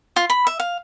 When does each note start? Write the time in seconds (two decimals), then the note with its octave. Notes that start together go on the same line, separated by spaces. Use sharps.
0.16 F4
0.30 B5
0.47 E5
0.60 F5